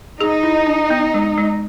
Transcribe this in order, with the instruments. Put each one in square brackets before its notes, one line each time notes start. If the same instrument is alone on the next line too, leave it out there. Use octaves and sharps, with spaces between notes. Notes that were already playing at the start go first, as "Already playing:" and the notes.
[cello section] D#4 [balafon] G#4
[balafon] E4
D4
B3
G#3
G#3